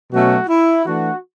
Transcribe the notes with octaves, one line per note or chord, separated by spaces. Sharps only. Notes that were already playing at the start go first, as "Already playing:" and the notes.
B2 F#3 A3 C#4 F#4
E4
E3 A3 D4 F#4